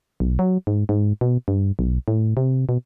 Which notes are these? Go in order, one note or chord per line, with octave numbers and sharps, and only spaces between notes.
B1
F#3
G#2
G#2
B2
G2
B1
A2
C3
B2